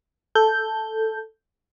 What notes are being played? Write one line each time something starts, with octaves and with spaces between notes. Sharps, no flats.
A4 G6